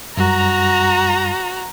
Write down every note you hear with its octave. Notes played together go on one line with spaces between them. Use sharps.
F#2 G3 F#4 A#5